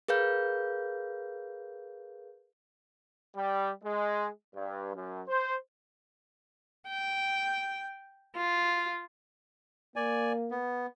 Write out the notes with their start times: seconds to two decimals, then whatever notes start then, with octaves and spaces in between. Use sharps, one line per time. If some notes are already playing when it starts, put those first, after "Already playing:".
0.08 G#4 A#4 B4 F5 G6
3.36 G3
3.84 G#3
4.55 G2
4.96 F#2
5.28 C5
6.89 G5
8.36 F4
9.96 A#3 D5 G#5
10.51 B3